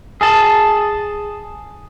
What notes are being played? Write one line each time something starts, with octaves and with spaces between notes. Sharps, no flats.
G#4 A5